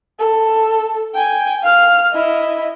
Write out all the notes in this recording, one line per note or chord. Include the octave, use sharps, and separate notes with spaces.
A4
G5 G#5
F5 F6
E4 D#5